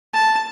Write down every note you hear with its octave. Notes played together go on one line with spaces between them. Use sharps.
A5